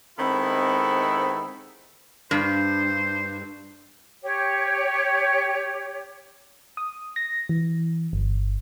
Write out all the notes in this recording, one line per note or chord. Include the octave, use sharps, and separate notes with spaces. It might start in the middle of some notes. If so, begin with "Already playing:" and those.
D#3 G#3 B3 C4 E4 A4
G2 C5
G4 C#5
D#6
A#6
E3
G1